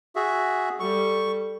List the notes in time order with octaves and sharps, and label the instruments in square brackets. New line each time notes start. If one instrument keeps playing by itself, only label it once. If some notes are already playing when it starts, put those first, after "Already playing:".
[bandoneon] F#4 G#4 E5
[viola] G3 A4 [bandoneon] C#6